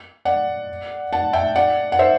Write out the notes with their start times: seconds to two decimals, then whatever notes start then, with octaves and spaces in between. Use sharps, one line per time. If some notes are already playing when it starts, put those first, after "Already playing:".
0.25 D5 F#5
1.13 F#5 A5
1.33 E5 G5
1.56 D5 F#5
1.92 F#5
1.99 C5 E5